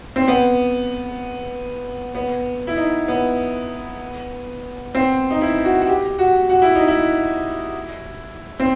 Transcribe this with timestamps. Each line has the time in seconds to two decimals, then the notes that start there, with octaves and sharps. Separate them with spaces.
0.16 C4
0.28 B3
2.15 B3
2.67 E4
2.76 D#4
3.08 B3
4.95 C4
5.31 D#4
5.41 E4
5.65 F#4
5.81 F#4
5.87 G4
6.19 F#4
6.50 F#4
6.62 E4
6.75 D#4
6.88 E4
8.60 C4